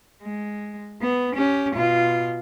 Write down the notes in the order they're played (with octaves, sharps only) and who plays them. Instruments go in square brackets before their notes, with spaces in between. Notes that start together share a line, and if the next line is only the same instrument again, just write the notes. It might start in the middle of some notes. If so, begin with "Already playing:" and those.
[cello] G#3
B3
C#4 G4
B2 F4